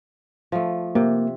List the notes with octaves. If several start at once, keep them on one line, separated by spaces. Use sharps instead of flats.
F3 A3
C3 A#3